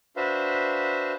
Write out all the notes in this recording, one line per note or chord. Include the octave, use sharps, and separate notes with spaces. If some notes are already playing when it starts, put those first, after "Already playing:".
D4 F#4 B4 C5 E5 F5